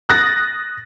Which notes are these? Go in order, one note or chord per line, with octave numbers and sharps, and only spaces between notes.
D#6 F#6 A6 A#6